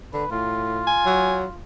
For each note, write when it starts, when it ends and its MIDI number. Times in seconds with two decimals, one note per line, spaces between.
0.14 0.24 50
0.14 0.29 71
0.31 0.92 45
0.31 1.62 65
0.87 1.36 80
1.06 1.45 54